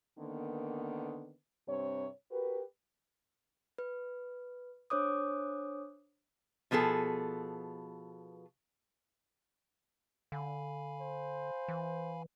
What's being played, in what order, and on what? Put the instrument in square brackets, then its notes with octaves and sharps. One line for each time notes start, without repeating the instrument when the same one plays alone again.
[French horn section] D3 D#3 A#3 B3
G2 C3 C4 C#5
F#4 G4 A#4 B4
[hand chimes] B4
D4 C5 C#5 D6 D#6
[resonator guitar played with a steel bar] B2 F3 B3 G#4 A4
[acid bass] D3 [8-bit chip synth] F5 G#5 B5
[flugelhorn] C5
[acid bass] E3